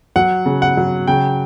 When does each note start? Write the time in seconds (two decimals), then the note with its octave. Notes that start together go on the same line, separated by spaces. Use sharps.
0.16 F#3 F#5
0.46 C#3
0.62 F#5
0.77 F#3
1.07 C#3 G5